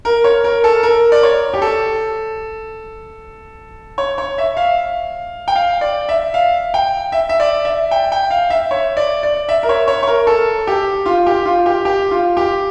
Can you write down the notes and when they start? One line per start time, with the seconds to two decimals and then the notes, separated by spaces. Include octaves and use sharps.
0.05 A#4
0.24 C#5
0.44 A#4
0.64 A4
0.83 A#4
1.12 D5
1.23 C#5
1.53 G4
1.62 A4
3.98 C#5
4.18 C#5
4.38 E5
4.57 F5
5.48 G5
5.55 F5
5.81 D5
6.09 E5
6.34 F5
6.74 G5
7.12 E5
7.29 E5
7.40 D5
7.65 E5
7.91 G5
8.12 G5
8.30 F5
8.50 E5
8.71 C#5
8.97 D5
9.23 D5
9.49 E5
9.63 A#4
9.69 C#5
9.88 C#5
10.03 C#5
10.07 A#4
10.27 A4
10.67 G4
11.06 F4
11.26 G4
11.45 F4
11.66 G4
11.85 G4
12.11 F4
12.37 G4